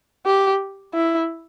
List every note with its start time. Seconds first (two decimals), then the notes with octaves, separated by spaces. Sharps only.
0.26 G4
0.94 E4